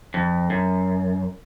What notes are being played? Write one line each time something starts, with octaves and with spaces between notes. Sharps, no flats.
F2
F#2